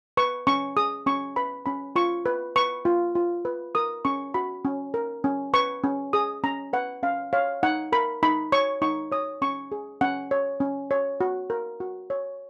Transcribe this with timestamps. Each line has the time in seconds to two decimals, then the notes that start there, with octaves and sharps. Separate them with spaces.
0.17 B4 C#6
0.47 C#4 C#6
0.77 G#4 D#6
1.06 C#4 C#6
1.36 B4 B5
1.66 C#4 B5
1.96 F4 C#6
2.26 B4
2.56 B4 C#6
2.85 F4
3.15 F4
3.45 B4
3.75 A#4 D#6
4.05 C#4 C#6
4.34 F#4 B5
4.65 C#4
4.94 A#4
5.24 C#4
5.54 B4 C#6
5.84 C#4
6.13 G#4 D#6
6.44 C#4 A#5
6.73 B4 F#5
7.03 C#4 F5
7.33 C#5 F5
7.63 D#4 F#5
7.92 A#4 B5
8.23 D#4 B5
8.52 C#5 C#6
8.82 D#4 C#6
9.12 C#5 D#6
9.42 C#4 C#6
9.72 G#4
10.01 C#4 F#5
10.31 C#5
10.60 C#4
10.91 C#5
11.21 F#4
11.50 A#4
11.80 F#4
12.10 C#5